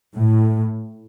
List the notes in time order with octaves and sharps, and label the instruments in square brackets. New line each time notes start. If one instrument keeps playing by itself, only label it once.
[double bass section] A2